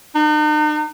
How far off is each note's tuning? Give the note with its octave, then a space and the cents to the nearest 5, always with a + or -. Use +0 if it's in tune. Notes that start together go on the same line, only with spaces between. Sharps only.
D#4 -45